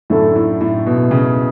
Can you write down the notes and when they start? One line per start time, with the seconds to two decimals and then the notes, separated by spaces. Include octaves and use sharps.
0.10 F#2 A2 D3 A3 E4 A4
0.35 A2
0.61 A2
0.86 B2
1.11 C#3